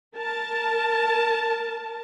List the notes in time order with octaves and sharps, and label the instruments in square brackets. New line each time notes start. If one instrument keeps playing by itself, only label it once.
[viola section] A#4 A5